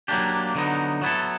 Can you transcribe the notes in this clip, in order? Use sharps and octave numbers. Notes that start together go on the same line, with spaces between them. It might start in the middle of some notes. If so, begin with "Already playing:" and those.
F#3 A#3 D4 G4
D3 F#3 B3 D#4
F#3 B3 E4 A4